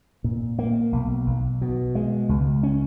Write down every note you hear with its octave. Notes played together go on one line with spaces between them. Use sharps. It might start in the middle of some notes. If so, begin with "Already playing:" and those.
A#2
A#3
B1
B1
B2
G#3
C#2
C#4